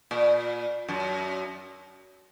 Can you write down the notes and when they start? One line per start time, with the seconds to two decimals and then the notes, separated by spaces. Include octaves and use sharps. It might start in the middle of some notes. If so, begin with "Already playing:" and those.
0.11 A#2
0.88 F#2